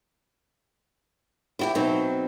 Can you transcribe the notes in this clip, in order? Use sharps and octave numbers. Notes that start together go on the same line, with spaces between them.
E4 F#4 G4
B2 F#3 C4 D#4